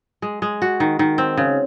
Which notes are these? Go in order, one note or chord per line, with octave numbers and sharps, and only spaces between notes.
G#3
G#3
F#4
D#3
D#3
C4
C#3